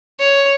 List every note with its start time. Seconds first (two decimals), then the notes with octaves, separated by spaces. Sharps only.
0.20 C#5